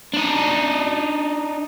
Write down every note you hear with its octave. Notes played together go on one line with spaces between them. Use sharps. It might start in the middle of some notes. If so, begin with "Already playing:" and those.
D4 D#4